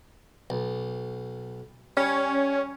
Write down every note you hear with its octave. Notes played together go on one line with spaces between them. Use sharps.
B1
G3 C#4